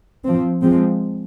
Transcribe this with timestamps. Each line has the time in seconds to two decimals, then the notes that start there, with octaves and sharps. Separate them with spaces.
0.24 F3 C4
0.62 F3 G#3 C4